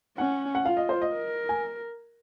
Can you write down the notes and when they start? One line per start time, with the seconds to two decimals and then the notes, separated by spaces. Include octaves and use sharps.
0.18 C#4 F#5
0.55 F#5
0.65 F4 F5
0.77 D#5
0.89 C5
1.02 D#5
1.14 A#4
1.49 G#5